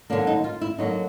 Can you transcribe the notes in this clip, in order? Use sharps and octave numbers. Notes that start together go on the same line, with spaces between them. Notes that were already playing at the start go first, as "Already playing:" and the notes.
D3 F#3 A#3 D4
D#4
F4
E4
D3 F#3 A#3 D#4